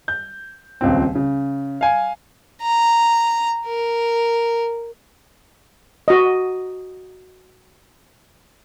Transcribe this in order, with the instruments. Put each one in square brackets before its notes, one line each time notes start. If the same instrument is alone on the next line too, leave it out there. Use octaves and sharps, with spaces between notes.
[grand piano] G6
D#1 C#2 C#3 C4
C#3
F5 G#5
[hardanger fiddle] A#5
A#4
[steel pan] F#4 D#5